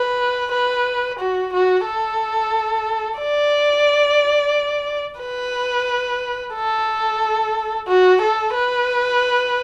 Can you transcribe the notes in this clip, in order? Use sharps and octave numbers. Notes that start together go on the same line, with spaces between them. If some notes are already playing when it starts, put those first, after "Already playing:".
Already playing: B4
B4
F#4
F#4
A4
D5
B4
A4
F#4
A4
B4